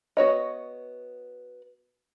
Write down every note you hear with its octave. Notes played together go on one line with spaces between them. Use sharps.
B3 F#4 C#5 D#5